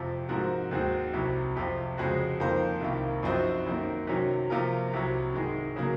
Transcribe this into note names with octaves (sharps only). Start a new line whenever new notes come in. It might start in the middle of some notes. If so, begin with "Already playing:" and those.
Already playing: F2 C3 F3
G#2 F3 C4 F#4 A#4
D#2 D#3 G#3 C4 F#4
C2 C3 F#3
F2 C3 F3
F2 C#3 G#3 C4 F#4
F2 D#3 A#3 F4 C5
C2 C3 D#3 A#3 F4
F#2 F3 C4 D#4 F#4
F#2 D#3 A#3
C3 D#3 F#3 C#4 F#4
C3 F3 A#3 F4 A#4
C2 C3 F#3
G#2 D#3 G#3
C#3 F#3 A#3